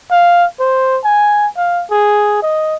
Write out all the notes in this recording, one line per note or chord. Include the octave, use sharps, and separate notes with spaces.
F5
C5
G#5
F5
G#4
D#5